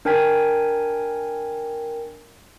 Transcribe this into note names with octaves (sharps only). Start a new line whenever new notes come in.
D4 A#4 G5 G#5 G#6 B6